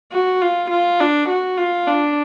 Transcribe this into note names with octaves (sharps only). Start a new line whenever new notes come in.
F#4
F4
F4
D4
F#4
F4
D4